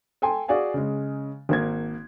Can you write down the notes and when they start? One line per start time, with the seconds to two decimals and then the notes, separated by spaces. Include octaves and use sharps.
0.22 A4 G5 G#5 C6
0.48 F#4 G#4 D5 F5 G#5
0.74 C#3 G#3
1.49 G#1 A#3 G#6